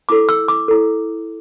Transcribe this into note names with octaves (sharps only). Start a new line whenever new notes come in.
E4 A4 D6
E6
D6
E4 A4